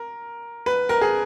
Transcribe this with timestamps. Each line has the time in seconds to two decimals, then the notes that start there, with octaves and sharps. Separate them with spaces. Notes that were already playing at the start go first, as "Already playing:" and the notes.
Already playing: A#4
0.66 B4
0.89 A#4
1.01 G#4